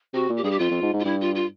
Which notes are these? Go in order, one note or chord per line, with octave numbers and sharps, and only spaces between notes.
C3 F#4
A#2
G4
G2 G#4
G4
F2 F4
F2
G#2
G#2
F4
G2 E4
F4
F4